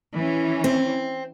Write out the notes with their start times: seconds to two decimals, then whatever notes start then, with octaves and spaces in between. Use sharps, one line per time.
0.15 E3 C#4
0.64 C4